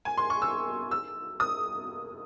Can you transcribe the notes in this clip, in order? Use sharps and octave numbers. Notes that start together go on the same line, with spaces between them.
G#5
C6
C#6
E6
E6
D#6